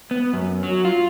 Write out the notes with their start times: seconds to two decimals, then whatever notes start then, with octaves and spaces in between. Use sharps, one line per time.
0.11 B3
0.33 F#2
0.63 F#3
0.85 F4